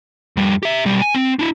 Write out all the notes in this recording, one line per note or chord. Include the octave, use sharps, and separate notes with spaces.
F2 G3
G4 E5
B1 G3
G#5
C4
D4 E4